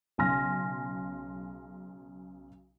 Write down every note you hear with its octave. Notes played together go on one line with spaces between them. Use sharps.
B1 C#3 G#5 C6 F6 A#6